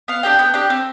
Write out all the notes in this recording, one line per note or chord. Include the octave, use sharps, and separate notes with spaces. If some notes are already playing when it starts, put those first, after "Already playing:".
B3 F5
D4 G4 G5
B3 G5
D4 G4
C4